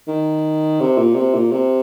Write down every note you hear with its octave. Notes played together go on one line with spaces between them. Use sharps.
D#3
C3
A#2
C3
A#2
C3